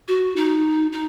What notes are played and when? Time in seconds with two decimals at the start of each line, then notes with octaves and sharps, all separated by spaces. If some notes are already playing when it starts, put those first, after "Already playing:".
0.08 F#4
0.36 D#4
0.92 D#4